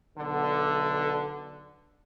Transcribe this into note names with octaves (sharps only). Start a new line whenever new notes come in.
B1 D3